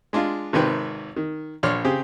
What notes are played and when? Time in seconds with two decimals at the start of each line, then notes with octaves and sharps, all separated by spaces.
0.13 G#3 D4 F4
0.53 G#1 C3 D#3 B4 G5
1.16 D#3
1.63 A#1 C#5 D5 C6 F6
1.84 C#3 C4 G4 G#4